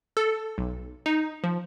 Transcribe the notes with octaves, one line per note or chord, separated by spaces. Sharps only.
A4
B1
D#4
F3